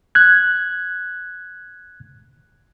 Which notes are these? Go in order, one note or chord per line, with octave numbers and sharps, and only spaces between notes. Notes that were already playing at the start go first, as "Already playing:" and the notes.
F#6 G#6